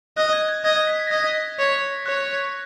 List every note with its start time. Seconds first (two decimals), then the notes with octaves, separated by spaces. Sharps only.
0.17 D#5 F#6
0.33 G#6
0.48 G#6
0.64 D#5 G#6
0.76 G#6
0.87 B6
1.00 B6
1.07 A#6
1.11 D#5 G#6
1.59 C#5
2.06 C#5 F#6